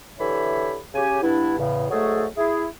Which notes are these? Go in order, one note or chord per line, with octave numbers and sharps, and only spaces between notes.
D3 E3 G4 C#5 E5 B5
C#3 G4 G#5
G2 B3 D4 E4
E2 A2 C#3
G#2 F#3 A3 G#4 A4
E4 G#4